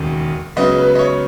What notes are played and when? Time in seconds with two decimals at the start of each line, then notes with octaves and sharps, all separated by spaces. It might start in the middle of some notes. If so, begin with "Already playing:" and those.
Already playing: E1 D#2 C#3
0.56 C#2 C#3 F#3 B3 D#5
0.78 B4
0.95 D#5
0.99 C#5